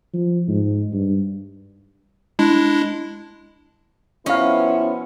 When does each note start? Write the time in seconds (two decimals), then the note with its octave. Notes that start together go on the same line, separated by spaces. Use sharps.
0.13 F3
0.48 G#2
0.93 G2
2.39 G#3 D4 E4
4.26 B2 F3 B3 C#4 E4 D#5 F5